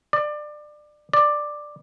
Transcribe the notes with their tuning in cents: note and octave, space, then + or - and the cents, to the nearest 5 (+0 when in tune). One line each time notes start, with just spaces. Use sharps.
D5 +25
D5 +10